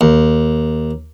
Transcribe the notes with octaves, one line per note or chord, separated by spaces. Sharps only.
D#2